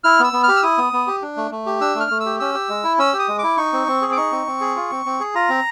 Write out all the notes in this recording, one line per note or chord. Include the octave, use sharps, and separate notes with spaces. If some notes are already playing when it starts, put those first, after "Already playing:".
E4 F6
B3
E6
B3
G4 F6
E6
E4 D#6
B3
B3
G4
D4
A3
A3
G4
D4 E6
A3 F6
A3
E6
G4
C#4 E6
G4
G#3
E4
C#4 E6
G4
D#6
G#3
E4 D6
D#4 C#6
C4
C4
G#4
D6
D#4 C#6
C4
C4
G#4
F4
C4
C4
G#4
F4 A#5
C4